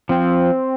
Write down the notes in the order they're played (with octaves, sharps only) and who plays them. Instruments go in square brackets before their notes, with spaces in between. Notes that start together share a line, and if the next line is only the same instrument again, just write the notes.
[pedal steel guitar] F3 [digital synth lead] C4